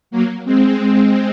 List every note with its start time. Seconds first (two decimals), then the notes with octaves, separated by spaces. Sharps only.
0.11 F#3 A#3
0.45 G#3 C4